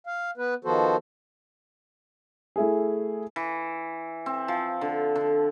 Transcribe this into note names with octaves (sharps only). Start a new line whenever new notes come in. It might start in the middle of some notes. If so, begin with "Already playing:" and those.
F5
B3 B4
D#3 F3 B3 F#4 A4 C5
A3 E4 G#4
E3
C4
F3
D3
D3